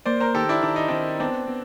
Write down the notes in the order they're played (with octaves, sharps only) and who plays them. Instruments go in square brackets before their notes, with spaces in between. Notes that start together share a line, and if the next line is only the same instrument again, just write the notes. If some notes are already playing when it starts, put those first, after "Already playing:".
[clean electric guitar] A#3 [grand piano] C5 D5
[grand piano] A#4 C5
[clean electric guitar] D#3 [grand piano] G4 A4
[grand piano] D4 E4
[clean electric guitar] D#3 [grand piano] D4
[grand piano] D#4
[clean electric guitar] D#3 [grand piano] C4 D4
[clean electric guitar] B3 [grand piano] C4 D4
[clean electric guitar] B3